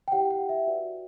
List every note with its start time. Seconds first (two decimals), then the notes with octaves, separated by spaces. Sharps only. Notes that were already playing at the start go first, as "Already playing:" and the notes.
0.08 G5
0.12 E4 G4 C#5 F#5
0.31 F#5
0.49 E5
0.67 F#4 B4 D5